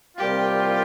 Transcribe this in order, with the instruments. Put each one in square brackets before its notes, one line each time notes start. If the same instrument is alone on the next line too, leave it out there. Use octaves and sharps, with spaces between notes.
[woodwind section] C2 A#2 G3 C4 F4 [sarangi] G4